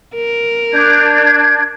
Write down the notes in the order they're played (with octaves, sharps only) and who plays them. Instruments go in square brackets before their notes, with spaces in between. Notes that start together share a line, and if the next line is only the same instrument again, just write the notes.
[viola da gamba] A#4
[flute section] D4 G6 G#6